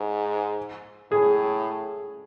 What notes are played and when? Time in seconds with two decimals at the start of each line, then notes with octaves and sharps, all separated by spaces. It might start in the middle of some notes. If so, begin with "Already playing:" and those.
Already playing: G#2
1.11 A2 G#4